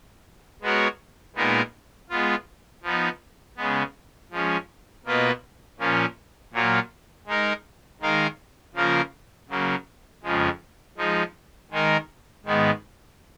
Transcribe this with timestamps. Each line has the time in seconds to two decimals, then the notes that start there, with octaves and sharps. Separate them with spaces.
0.62 G#3 B3 F#4 A#4 C#5
1.36 A#2 G#3 B3 D#4 A#4
2.09 G#3 B3 F4
2.83 F3 B3 D#4
3.57 C#3 G#3 B3
4.31 F3 G#3 C#4
5.06 B2 A#3 F4 B4 D#5
5.79 A#2 F3 A#3 C#4
6.53 A#2 F#3 A#3 F4
7.27 G#3 D#4 A#4
8.01 D#3 G#3 D#4 A#4 F5
8.75 C#3 F3 A#3 F4 A#4
9.49 C#3 F#3 A#3
10.23 F2 C#3 F3 G#3
10.98 F3 G#3 D#4
11.71 D#3 G#3 D#4 A#4
12.46 G#2 D#3 G#3 B3